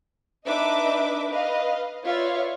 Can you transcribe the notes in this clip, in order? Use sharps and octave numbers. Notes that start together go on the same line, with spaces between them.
D4 D#4 B4 D#5 E5 D6
B4 D#5 F5
F4 B4 C#5 D5 E5 F5